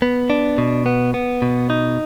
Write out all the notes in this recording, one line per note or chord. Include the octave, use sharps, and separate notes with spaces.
B3
D4
B2
B3
B3
B2
D#4